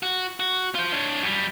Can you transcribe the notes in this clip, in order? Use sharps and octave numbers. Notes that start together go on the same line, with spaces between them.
F#4
F#4
F4 C5
D4 C#5
F#2 G3